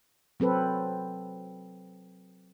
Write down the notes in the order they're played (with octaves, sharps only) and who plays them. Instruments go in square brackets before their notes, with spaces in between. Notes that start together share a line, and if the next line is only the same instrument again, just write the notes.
[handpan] F#3 C4 A4 B4